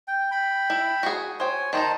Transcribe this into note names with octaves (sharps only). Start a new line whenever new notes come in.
G5
G5 B5
E4
F#4 G#4
C5 C#5 G5 G#5
D#3 D#4 C5 A5 A#5